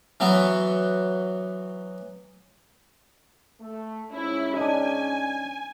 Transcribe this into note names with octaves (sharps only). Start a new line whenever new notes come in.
E3 F#3 B3
A3
G#2 C#4 E4
D4 D#4 G#5